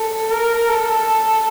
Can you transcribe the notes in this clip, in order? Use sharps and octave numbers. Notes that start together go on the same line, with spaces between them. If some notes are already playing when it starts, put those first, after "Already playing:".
Already playing: A4
A#4
A4